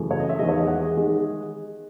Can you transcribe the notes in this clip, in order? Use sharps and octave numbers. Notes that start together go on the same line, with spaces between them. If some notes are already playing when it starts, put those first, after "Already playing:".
Already playing: F#2 C#3 E3 A3
C#5
D#5
E5
E2 D#3 G#3 D#5
C#5
D#5
F#5
G#4
D#3 G#3